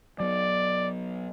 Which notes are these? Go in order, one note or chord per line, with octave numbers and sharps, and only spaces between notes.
F#3 B3 D5